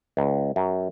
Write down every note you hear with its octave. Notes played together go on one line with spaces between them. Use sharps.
C#2
F#2